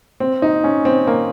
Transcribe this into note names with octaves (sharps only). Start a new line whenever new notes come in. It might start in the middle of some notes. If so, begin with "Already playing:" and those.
C4
D#4
C#4
C4
A#3